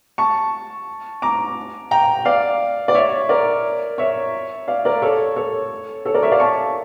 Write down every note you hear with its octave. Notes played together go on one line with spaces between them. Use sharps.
A5 C#6
A#5 D6
G5 A#5
D5 F5
D5
C#5 E5
A#4 D5
C#5 E5
D5 F5
A#4 D5
A4 C#5
A4 C#5
A4 C#5
A#4 D5
C#5 E5
D5 F5
A5 C#6